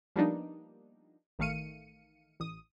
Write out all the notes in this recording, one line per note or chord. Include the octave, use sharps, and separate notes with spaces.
F3 G3 A#3 B3 D4 D#4
A1 D#3 A3 F5 C#7 D#7
A1 D#6